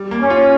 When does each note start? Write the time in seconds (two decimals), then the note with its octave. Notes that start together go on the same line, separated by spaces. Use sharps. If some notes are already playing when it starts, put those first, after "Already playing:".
Already playing: G3
0.11 A#3
0.21 C#4
0.30 F4